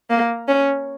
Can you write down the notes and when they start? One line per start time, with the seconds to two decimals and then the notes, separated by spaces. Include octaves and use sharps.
0.10 A#3
0.48 C#4